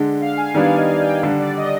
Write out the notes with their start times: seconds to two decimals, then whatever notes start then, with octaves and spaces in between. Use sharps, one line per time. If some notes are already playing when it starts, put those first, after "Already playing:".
Already playing: D3 G#3 D4
0.21 F5
0.37 G#5
0.54 D#3 G3 B3 D4 D5
0.77 D#5
1.01 G5
1.22 D3 G3 D4 F5
1.39 D5
1.57 D#5